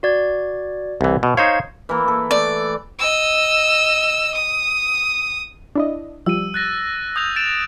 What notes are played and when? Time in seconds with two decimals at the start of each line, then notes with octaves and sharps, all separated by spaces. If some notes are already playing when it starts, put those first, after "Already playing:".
0.03 F#4 D5 G#6
1.01 C2 E3
1.23 B2
1.37 D#4 C5 C#5 F5 G#6
1.89 E3 A#3
2.08 A4 B4
2.31 A3 D5
2.99 D#5 E6
4.35 D#6
5.76 D4 E4 D#5
6.26 F3 G3 E6 D#7
6.54 F#6 A6 A#6
7.16 D#6 G6 F7
7.36 A6 D7 E7